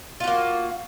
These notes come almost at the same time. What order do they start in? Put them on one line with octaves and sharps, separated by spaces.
F4 F#4 A#3